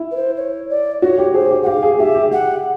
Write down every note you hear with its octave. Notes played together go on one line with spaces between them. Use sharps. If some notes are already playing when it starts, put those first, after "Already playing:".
Already playing: E4
B4
C5
C#5
D5
F#4 C#5
G4
G#4 C5
G4
F#5
G4 F5
G#4
G4 E5
G4
G4 F#5